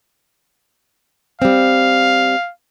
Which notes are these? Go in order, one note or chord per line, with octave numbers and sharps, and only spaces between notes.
G3 C4 F5